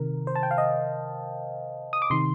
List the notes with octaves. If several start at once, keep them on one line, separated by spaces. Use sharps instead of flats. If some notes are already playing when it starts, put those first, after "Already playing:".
Already playing: C3 D#3 A#4
C5
A5
G5
F5
D#5
D#6
D6
C3 D#3 C6